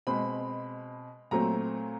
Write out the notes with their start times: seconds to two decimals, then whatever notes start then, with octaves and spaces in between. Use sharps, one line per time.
0.07 B2 G#3 C4 B5
1.31 A#2 F#3 A3 C4 A#5